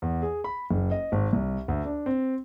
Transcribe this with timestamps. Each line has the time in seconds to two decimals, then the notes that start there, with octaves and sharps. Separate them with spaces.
0.02 E2
0.22 G#4
0.44 B5
0.71 F#1
0.91 D#5
1.12 G#1
1.33 C2
1.68 D2
1.85 D4
2.06 C4